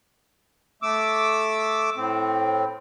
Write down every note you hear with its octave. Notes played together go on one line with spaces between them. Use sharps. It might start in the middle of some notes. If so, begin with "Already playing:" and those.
A3 D6 E6
A2 C4